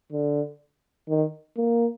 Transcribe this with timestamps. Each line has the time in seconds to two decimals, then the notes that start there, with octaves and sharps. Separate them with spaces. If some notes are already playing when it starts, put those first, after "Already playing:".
0.12 D3
1.09 D#3
1.57 A#3